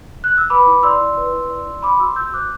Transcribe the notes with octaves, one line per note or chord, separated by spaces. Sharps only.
F#6
E6
B4 B5 D6
E4
D5 C6 E6
E4
B4
E4
D5
E4
C5 B5 D6
F#4 C6 E6
F#4 E6 G6
C5 D6 F#6